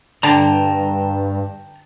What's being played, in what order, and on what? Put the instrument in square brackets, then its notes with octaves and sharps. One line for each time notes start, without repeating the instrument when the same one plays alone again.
[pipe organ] G2 [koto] D3 [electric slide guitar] G5 A5 A#5